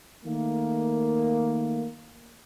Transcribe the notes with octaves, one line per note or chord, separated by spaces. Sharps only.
D#3 A3 A#3